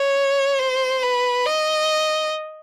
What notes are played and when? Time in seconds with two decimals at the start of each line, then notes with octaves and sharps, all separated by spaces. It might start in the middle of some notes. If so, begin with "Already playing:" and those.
Already playing: C#5
0.59 C5
1.03 B4
1.46 D#5